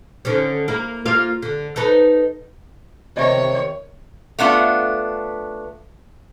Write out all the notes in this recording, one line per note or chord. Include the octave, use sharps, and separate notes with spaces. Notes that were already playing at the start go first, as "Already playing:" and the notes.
D3 D#3 C#4
A#3 E4 A#4
A#3 F4 F5
D3
D#4 A4 B4
C3 D#3 C#5 D#5 E5
A3 B3 D4 F4